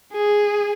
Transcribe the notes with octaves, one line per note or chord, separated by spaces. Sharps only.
G#4